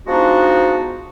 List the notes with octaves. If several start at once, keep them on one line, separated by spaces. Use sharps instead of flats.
F3 G#3 B3 D4 D#4 F#4